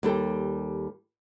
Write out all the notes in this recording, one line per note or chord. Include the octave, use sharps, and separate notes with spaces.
D#2 G3 A4 G5